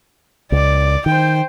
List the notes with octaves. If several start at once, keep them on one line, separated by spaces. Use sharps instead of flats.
C#2 D5
D#3 C5 G5